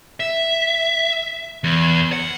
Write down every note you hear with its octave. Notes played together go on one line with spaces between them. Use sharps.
E5
E2
F#5